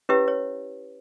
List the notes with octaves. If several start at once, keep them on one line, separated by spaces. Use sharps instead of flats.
C#4 E4 G4 B4 C#5 E5
C#5